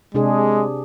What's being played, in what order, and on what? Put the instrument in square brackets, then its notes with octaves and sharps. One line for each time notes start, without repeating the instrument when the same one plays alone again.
[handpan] C3 D4 G#4 [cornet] G#3